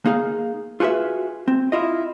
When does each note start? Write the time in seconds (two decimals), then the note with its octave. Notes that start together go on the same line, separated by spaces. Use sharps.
0.06 A#3 D#4 G#4 F5
0.80 F4 F#4 G#4 B4 E5
1.48 C4
1.72 E4 F4 D#5